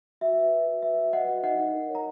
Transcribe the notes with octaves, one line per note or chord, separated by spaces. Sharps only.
F#4 E5
B4
B4
F#4
B4 E5
F#4
B4 D#5 F#5
F#4
D#4 D#5 F#5
D#4
A#4
C#5
A#5